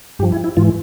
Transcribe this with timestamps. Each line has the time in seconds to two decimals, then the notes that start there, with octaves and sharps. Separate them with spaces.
0.19 G2 G4
0.23 F3
0.32 E4
0.44 E4
0.57 G#2 E3 F4